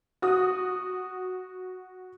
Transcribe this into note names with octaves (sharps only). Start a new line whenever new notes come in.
F#4 D#6